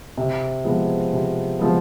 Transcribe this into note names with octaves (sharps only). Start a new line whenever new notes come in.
C3
F3 G#3 B3
C3
F3 G#3 B3